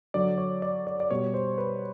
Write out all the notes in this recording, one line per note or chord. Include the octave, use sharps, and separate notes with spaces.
D3 F#3 D5
C#5
D5
D5
D5
B2 G3 C#5
C5
B4